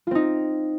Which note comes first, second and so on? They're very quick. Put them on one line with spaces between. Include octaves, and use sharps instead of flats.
F4 C4 D#4